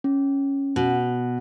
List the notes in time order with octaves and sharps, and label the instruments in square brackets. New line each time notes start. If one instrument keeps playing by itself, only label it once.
[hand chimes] C#4
[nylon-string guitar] B2